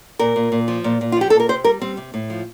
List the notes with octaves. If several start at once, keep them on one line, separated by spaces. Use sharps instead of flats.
A#2 A#4
A#2
A#2
F3
A#2
A#2
F4
F3 G4
A#2 A4
A#4
C3 C5
G3 A#4
G3 C4
C3
A2
F3